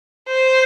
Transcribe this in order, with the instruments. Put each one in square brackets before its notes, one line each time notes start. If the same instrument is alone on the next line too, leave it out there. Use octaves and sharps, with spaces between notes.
[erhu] C5